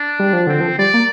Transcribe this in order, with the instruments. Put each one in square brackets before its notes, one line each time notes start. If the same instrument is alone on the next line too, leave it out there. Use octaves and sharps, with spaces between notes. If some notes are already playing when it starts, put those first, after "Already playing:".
Already playing: [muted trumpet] D4
[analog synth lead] G3
F3
[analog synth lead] D3 [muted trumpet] C4
[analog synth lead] F3
[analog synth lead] G3 [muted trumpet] D5
[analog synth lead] A#3